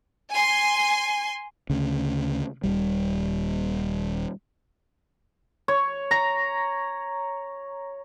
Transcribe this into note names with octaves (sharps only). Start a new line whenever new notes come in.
G#5 C6
D2 C#3
D#1 D#2 G3
C#5
A#5